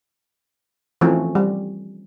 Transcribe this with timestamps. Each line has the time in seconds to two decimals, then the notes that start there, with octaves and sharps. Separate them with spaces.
1.01 E3 F3 A3 C4 C#4
1.35 G3